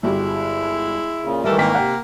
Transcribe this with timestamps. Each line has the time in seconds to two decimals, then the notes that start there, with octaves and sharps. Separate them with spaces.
0.03 G1 G#3 E4 F#4 G4
1.21 A#2 C#3
1.44 D#3 E3 G3 A3 A#3 A4 E5
1.58 G#1 A#3 G5 B6
1.75 C3 F#5 G5